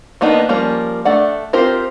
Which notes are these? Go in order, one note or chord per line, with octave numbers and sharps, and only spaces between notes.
D#3 A#3 B3 D4 D#4
F3 G3 A#3 C#4
A3 D4 D5 F#5
C4 F4 G4 A#4 C5